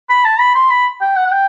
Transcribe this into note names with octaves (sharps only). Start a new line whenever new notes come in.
B5
A5
B5
C6
B5
G5
F#5
F#5
G5